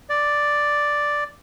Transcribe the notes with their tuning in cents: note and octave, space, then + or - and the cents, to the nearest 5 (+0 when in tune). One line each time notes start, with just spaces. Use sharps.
D5 +0